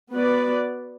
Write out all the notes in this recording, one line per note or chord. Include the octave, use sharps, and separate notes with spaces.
B3 F#4 B4 D5